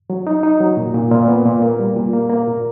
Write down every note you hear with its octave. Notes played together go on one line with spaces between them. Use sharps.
F#3
D#4
D#4
F#3
A#2
A#2
A#2
B3
A#2
A#3
G3
A#2
A#3
A#3
A#2